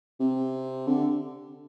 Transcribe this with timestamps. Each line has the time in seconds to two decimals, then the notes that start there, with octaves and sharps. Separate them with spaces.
0.20 C3
0.87 D3